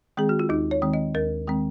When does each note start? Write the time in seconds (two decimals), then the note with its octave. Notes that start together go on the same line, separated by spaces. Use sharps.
0.17 D#3 G#3 C4 G#4
0.29 F#4
0.39 F4
0.49 D#2 D#4
0.71 C#5
0.82 D#3 G#3 C4
0.94 D#5
1.14 D#2 A#4
1.47 D#3 G#3 C4